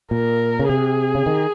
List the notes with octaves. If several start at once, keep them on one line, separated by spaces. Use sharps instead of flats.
A#2 A#4
C#3
C3 G#4
C#3
D#3